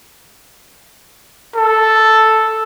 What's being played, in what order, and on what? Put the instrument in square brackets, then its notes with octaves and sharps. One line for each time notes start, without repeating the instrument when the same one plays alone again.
[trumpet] A4